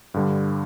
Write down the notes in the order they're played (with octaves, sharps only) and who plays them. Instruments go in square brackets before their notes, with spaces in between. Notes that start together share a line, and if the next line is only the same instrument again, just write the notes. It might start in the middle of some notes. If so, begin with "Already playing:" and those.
[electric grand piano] G2 D3 G3